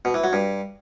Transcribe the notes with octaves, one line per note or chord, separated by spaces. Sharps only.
B2
E3
F#3
G2